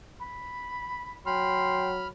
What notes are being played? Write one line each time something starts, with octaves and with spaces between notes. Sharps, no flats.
B5
F#3 G5 B5 C6 F6